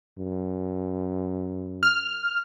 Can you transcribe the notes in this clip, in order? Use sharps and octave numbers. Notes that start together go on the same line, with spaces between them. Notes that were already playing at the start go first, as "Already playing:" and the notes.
F#2
F6